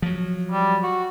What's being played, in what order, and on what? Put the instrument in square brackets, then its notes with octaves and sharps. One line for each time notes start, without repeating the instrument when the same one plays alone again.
[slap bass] F3 F#3
[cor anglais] G3
F#4